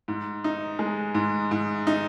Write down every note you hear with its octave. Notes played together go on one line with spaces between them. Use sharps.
G#2
D#4
G#3
G#2
G#2
D#4